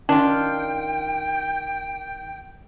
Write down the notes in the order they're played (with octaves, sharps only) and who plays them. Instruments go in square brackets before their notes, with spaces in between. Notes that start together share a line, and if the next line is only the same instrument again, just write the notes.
[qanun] D#3 [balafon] C#4 [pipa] D4 F4 [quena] G5